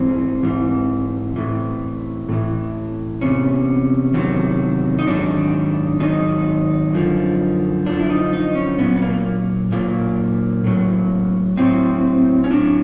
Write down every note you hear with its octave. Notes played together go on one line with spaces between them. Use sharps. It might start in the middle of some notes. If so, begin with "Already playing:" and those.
Already playing: G#2 E3 C4
G#2 E3
A2 E3
A2 E3
E2 C3 C#4
E2 C3 D#3 F#3
D#4
G#2 D#3 F#3 D4
G#2 D#3 F#3 D#4
F#2 D3 F3
F#2 D3 F3 D4
E4
D#4
D#4
C#4
A#2 F#3 B3
B3
A#3
A#2 F#3 A#3
A2 F#3
A2 F#3 C4
C#4
A2 F#3 D4